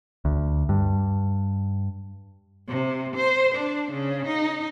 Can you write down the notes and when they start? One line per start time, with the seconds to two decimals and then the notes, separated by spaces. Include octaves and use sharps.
0.25 D2
0.69 G2
2.68 C3
3.16 C5
3.55 D4
3.92 C#3
4.27 D#4